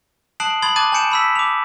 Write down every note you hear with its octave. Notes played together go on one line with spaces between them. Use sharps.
A5 D#6 F#6 C7 D7 F#7
B5 C6 D#6 G#6 A6 F#7
A5 D6 F#6 G#6 A6 D#7
G#5 A5 G6 C#7 D7 E7
B5 E6 B6
D6 F7